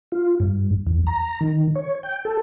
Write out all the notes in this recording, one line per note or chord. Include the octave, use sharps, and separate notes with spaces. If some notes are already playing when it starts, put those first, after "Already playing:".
F4
G2
E2
A#5
D#3
C#5
G5
A4